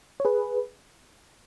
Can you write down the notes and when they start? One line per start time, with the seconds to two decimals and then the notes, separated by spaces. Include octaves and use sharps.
0.20 C#5
0.25 G#4 B4